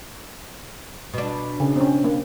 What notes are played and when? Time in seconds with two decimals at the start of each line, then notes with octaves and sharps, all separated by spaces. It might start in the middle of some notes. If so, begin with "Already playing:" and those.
1.14 B2 D4
1.60 C#3
1.76 C4 C#4
2.04 A#3